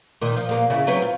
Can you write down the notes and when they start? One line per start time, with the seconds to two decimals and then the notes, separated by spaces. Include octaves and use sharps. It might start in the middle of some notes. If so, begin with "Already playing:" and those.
0.22 A#2 D#3
0.37 F3
0.49 A#2 A#3
0.70 C#3 E4
0.87 F#3 C4 B4
1.02 F4